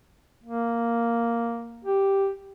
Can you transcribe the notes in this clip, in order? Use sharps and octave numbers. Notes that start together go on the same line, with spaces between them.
A#3
G4